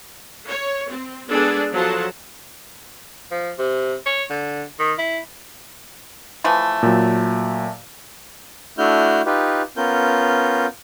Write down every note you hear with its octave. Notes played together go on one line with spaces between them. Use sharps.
C#5
C4
G#3 B3 D4 G#4 A4 D5
F3 F#3 F4 A4 F#5 A5
F3
C3
C#5
D3
D#3
E4
E3 F3 A3
A#2 F#3
A3 D4 E4 F#4 F6 G6
D#4 F4 G4 B4
B3 C#4 F4 A#4 G6